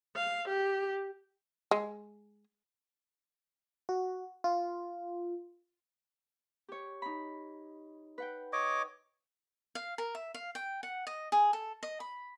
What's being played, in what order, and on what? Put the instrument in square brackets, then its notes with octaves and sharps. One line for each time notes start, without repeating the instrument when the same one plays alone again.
[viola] F5
G4
[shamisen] G#3
[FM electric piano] F#4
F4
[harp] G4 C#5
D#4 B5
B4 F#5 G5
[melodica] C#5 D#5 D6
[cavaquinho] F5
A#4
E5
F5
G5
F#5
D#5
G#4
A4
D#5
B5